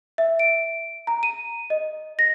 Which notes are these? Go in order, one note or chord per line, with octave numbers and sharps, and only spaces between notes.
E5
D7
A#5
D#7
D#5
A#6